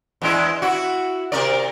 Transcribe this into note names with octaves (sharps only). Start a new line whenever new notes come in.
E2 G#3 E4
E4 F#4
C3 A#4 D5